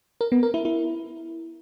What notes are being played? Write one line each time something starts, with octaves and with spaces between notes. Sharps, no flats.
A#4
B3
A#4
E4
E4